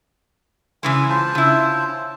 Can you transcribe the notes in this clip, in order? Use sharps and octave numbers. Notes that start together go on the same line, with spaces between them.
C#3 E3 G#3 G#5
F4 C5 A5
C#3 E4